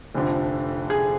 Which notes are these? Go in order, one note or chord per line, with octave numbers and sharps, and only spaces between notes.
F1 F2 D3 F3
G#4